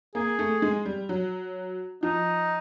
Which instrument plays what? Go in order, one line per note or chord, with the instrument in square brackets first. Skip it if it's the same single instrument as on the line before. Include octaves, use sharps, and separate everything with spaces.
[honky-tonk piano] A#3 [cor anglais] G#4
[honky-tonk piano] A3
G#3
G3
F#3
[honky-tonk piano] F3 [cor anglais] D#4